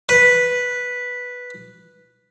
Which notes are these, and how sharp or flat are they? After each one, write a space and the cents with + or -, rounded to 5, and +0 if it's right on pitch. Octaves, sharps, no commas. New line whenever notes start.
B4 -5